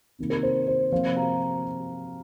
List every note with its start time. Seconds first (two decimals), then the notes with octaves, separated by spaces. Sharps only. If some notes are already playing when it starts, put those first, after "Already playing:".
0.19 C3 D#3 A#3
0.30 A#4
0.43 C5
0.68 C5
0.92 C3 F3 A#3 C5 F5
1.16 F5 A#5